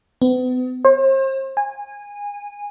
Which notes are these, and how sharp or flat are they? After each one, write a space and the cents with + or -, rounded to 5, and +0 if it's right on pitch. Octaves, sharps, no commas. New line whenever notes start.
B3 +40
C5 +40
G#5 -20